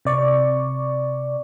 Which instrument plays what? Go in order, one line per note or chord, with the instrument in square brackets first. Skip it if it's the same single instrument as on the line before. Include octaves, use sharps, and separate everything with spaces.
[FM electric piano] C3 D5 C#6